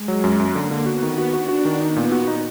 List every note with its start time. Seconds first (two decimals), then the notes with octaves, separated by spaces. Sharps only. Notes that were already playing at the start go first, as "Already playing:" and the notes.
Already playing: G#3
0.08 F#3
0.24 F#2
0.39 F#2 A#3
0.55 D3
0.71 D3
0.86 B3 F#4
1.03 D#3
1.18 F#4
1.33 D4 F#4
1.49 F#4
1.65 D#3
1.80 B3 D#4
1.96 A#2
2.12 F#4
2.27 D#4